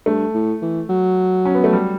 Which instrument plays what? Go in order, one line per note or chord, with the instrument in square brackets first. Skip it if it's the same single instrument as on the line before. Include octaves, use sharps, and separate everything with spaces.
[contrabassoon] G2 [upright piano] A3
[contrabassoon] A2
E3
F#3
[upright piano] C#4
B3
A3
G3